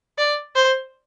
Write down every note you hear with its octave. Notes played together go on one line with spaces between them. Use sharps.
D5
C5